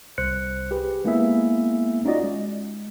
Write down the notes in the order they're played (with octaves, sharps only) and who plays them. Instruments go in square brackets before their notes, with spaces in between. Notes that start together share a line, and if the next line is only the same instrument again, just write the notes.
[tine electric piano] C2 C5 F#6 C#7
G4 G#4 B4
G#3 A#3 B3 E4 G#4 E5
C#4 D#4 F4 F#4 D5 D#5
G#3